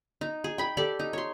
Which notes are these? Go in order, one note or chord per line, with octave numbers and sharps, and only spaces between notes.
D#4
G#4
G5 B5
G4 A4 D5
D#4
C#5 C6